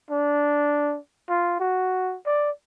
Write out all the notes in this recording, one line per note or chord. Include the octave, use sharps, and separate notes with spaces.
D4
F4
F#4
D5